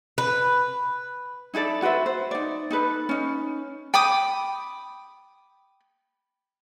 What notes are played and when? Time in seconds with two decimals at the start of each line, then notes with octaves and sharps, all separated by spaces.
0.18 B4
1.54 D#4 E4 A4 D5
1.82 F#4 B4 C5 E5
2.06 C5
2.31 D#4 D5
2.71 D#4 A4 B4
3.09 C#4 D#4
3.94 G5 B5 D6 D#6